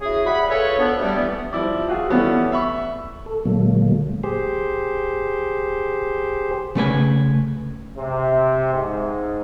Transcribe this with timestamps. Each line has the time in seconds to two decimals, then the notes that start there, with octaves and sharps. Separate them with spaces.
0.01 C#4 E4 F#4 G#4
0.26 G3 E5 F#5 B5
0.48 F4 G#4 A4 B4 C#5
0.78 D2 B3 D4
0.98 G3 A3
1.15 E3 B3
1.53 F3 G3 E4 D5
1.88 F4 F#4 G#4
2.09 E3 G3 A3 B3 C#4 F#4
2.52 E5 B5 C#6
3.26 A4
3.46 A#2 D3 F#3 G#3 A#3
4.24 G4 G#4 C5
6.75 C#3 A3 B4 G#5
7.97 C3
8.74 G#2